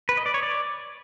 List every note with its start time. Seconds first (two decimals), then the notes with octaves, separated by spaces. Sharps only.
0.09 B4
0.17 D#5
0.26 D5
0.34 C#5
0.43 D5